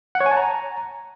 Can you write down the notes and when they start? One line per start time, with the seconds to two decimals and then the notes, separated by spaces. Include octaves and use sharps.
0.15 F#5
0.21 C#5
0.26 G#5
0.31 A5
0.37 A#5